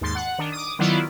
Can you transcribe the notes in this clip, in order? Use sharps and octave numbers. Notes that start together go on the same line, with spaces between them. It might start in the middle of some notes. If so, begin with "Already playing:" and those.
D#2 G#2 C6 A6
F#5
D#3 D4
D6 D#6
D#3 F#3 B3 E4 F4 D5